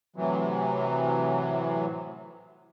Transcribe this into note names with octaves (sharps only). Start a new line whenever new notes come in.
A2 C3 E3 F#3